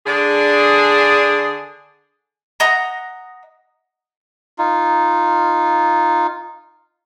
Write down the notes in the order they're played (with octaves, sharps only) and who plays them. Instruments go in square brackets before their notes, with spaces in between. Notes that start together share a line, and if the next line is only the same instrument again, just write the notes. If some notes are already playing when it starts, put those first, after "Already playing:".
[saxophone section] D3 D4 G#4
[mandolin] D#5 F#5 A#5
[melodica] D#4 F4